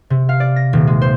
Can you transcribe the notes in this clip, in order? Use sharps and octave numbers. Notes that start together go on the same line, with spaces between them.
C3
F5
D5
A#6
D#1
G#3
C5